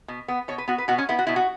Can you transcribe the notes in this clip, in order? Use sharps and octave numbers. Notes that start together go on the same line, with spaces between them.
B2
B3
B2 C#5
B4
B3 F#4
B4
B2 F#4
C#4
B3 E4
F#4
B2 E4
F#4